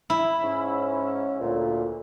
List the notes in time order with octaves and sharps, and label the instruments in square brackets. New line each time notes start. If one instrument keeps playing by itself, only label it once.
[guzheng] E4
[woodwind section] G#2 C#4
D2 A#2